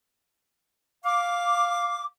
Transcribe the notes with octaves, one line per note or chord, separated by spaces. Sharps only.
F5 D6